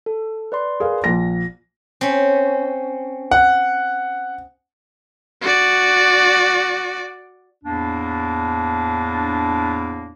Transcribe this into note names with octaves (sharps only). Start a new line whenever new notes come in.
A4
B4 D5 C6
G#4 A#4 F5
A#1 A#6
C4 C#4
F#5
F#4 D5
E2 A2 A#3 D4